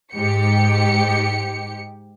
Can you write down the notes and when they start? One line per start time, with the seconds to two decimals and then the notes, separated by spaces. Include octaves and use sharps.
0.14 G#2 G4 C#7